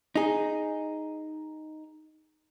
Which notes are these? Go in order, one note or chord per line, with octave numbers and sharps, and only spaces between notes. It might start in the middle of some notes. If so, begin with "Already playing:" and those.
D#4 G#4